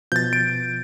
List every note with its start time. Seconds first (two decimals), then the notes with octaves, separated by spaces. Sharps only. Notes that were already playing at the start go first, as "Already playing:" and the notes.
0.12 B2 F3 G6 A6
0.33 D7